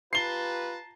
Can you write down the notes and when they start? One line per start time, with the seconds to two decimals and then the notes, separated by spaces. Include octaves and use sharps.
0.13 F4 G4 B4 A5 A#5 C7 G7